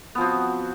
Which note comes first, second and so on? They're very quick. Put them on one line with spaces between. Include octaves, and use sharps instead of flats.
B3 F3 C4 F#4